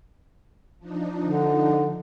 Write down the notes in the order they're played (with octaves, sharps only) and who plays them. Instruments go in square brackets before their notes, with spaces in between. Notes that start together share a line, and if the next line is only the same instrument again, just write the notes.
[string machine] F3 D4 D#4
[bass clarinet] D3